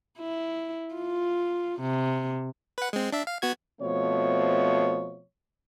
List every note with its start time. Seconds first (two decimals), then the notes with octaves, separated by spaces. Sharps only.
0.18 E4
0.95 F4
1.80 C3
2.78 B4 F#5
2.93 G#3 C4
3.13 D4 E5
3.27 F5
3.42 B3 F#4 G#6
3.81 B2 F3 A3 C4 C#5